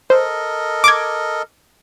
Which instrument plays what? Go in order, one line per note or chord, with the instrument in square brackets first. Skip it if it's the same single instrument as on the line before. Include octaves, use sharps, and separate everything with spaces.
[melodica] A4 A#4 D#5 [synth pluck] C5
[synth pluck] D6 G#6